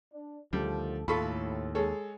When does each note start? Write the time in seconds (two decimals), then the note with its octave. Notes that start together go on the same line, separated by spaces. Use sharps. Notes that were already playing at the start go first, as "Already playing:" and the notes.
0.13 D4
0.53 D2 D#3 F3 G3 A4
1.08 D#2 A2 F4 A4 B5 C#6 B6
1.75 G#3 G#4 A4 C#5